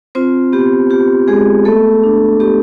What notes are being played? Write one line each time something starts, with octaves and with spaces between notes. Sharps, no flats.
C4 F4 C5
B3 G4
F4 G4
G#3 G#4
A3 B3 A4
D4
B3 G4